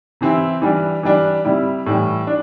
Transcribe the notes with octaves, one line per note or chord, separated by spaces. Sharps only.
C3 E3 C4 E4
E3 G3 D4
E3 G3 D4
C3 G3 E4
A2 E3 G3
D4